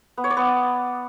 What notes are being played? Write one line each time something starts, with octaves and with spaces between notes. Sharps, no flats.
B3
C#5
D5
B3